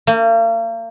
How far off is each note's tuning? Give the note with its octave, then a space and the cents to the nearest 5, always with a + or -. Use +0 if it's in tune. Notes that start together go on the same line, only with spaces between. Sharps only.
A#3 -40